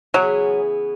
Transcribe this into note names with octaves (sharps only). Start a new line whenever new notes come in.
C#3 E3 F#3 B3 G#4